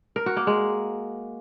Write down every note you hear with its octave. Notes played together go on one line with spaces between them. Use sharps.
A#4
F#4
A#3
G#3